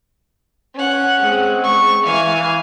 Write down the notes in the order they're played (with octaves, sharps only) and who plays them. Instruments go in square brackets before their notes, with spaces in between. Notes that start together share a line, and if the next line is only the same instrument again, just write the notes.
[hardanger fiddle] C#4 F#5
[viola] G#3 C4
[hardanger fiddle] C#6
[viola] E3 G#5 [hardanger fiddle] F5